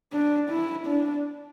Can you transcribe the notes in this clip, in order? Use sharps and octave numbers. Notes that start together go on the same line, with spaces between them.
D4
E4
D4